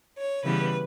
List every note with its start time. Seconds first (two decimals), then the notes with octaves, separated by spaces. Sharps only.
0.17 C#5
0.44 C#3 E3 G3 B3 B4